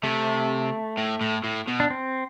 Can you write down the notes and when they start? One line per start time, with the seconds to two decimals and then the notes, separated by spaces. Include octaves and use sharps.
0.03 C3 A3
0.98 A2
1.21 A2
1.44 A2
1.67 B2
1.80 D4
1.90 C4